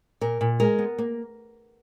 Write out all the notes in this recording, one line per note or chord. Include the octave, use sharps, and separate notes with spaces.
A#2 A#4
A#2
G#3 A#4
B3
A#3